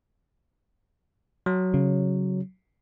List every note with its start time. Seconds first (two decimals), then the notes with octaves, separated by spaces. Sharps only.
1.46 F#3
1.74 C#3